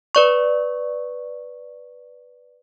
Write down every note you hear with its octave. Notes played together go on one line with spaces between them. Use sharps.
B4 D5 C#6